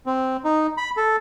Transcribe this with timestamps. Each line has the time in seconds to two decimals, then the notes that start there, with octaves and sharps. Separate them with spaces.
0.06 C4
0.44 D#4
0.77 B5
0.97 A4